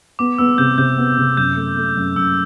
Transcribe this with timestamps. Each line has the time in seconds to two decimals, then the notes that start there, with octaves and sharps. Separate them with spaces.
0.19 B3 D6
0.38 B3 E6
0.58 C3 G6
0.78 C3 G6
0.98 B3
1.18 C3
1.37 F#2 G6
1.56 A3
1.77 A3
1.97 F#2
2.16 F#2 E6